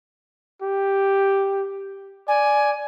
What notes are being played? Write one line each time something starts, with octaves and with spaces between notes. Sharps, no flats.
G4
D5 G#5